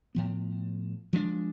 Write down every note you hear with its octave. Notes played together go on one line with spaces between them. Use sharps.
A2 F3 B3
F3 G#3 B3 D4